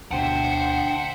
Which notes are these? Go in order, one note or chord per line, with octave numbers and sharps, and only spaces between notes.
D2 B2 D4 C5 E5 F#5 G5